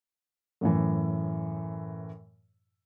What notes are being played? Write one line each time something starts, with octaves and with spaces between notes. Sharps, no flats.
F#2 A2 E3